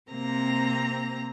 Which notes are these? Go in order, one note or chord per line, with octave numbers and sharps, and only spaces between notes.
C3 A#3 C4 A#5 A#6